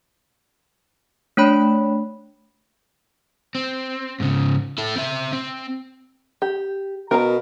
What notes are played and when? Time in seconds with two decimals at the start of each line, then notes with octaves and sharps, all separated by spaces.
1.37 A3 D4 C#5 B5
3.55 C4
4.20 G#2 C#3
4.78 E4 A4
4.96 C4 E5
5.33 C4
6.42 G4
7.11 B2 A#4 F5 A#5